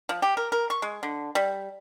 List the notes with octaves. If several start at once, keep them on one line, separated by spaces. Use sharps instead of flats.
F3
G4
A#4
A#4
C#6
G#3
D3
G3